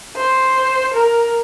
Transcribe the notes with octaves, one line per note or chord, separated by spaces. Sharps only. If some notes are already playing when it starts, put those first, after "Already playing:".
C5
A#4